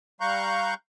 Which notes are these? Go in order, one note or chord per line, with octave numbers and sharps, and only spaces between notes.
G3 F5 A#5 C#6 F#6 G6